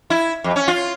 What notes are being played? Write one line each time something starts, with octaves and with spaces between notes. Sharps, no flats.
E4
F2
C#4
F4